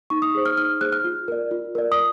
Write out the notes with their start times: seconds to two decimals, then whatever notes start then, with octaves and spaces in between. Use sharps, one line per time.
0.10 D#4 C#6
0.22 D#6
0.34 G#4 C5
0.46 F6
0.57 D#4 F6
0.81 G#4 C5 F#6
0.93 F6
1.04 F4
1.28 A#4 D5
1.51 F4
1.75 A#4 D5
1.92 D#6